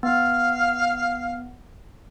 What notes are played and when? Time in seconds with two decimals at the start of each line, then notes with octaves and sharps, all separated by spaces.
0.03 B3 F5